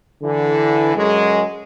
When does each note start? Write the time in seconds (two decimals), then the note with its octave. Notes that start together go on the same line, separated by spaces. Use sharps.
0.23 D3 E3
0.95 F#2 F#3 G#3